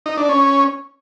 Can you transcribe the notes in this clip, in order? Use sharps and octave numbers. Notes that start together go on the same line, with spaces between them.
D#4
D4
C#4